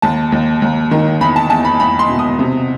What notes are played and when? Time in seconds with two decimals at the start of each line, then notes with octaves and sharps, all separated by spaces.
0.02 D#2 A5
0.32 D#2
0.62 D#2
0.91 D#3
1.20 E2 B5
1.36 A5
1.50 E2 A5
1.65 B5
1.79 E2 B5
1.99 C6
2.09 B2
2.19 D#6
2.39 C3